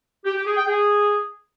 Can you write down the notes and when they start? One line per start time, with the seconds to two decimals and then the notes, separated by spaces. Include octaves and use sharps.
0.25 G4
0.35 G4
0.46 G#4
0.56 G5
0.67 G#4